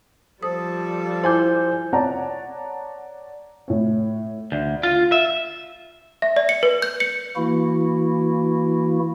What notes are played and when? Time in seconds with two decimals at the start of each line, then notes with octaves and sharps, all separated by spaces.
0.43 F3 G3 A4 C5 D#6
1.24 E4 C5 G#5 D6 G6
1.93 C#5 D5 F#5 A5 A#5
3.68 A2 C#5
4.52 D2
4.83 F4
5.12 E5
6.22 E5
6.36 D5
6.49 C#7
6.63 B4
6.82 G6
7.00 C#7
7.36 E3 A#3 E4 F#4